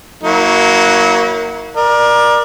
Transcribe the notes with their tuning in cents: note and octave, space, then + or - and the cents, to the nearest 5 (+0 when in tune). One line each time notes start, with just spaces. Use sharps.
F#3 +0 A#3 +0 E4 -40
A#4 +25 D5 +20